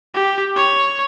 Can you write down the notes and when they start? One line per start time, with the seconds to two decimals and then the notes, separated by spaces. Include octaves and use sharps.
0.14 G4
0.56 C#5